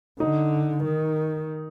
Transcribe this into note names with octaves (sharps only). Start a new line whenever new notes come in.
D3 D#4
D#3